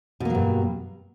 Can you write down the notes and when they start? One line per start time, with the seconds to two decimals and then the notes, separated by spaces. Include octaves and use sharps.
0.20 B2
0.25 A#3
0.30 F#3
0.35 G2